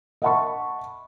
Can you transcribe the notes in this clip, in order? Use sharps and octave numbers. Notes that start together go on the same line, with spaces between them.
D#5 E5 F#5 A5 B5 C#6